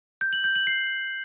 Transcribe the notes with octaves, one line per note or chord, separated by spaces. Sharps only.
G6
F#7
G6
F#7
C7